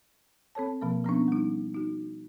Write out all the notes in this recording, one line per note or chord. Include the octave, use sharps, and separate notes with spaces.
C4 A4 C#5 A5
B2 F3 A#3
F3 B3 C#4 D4
G3 D#4
D#4 F#4